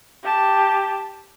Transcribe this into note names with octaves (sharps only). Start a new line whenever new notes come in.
G4 A5